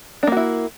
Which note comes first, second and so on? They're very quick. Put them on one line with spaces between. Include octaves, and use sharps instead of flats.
D4 A#3 F#4 E4